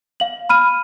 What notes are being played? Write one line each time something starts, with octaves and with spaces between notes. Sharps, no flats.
F5 F#7
B5 F6 D#7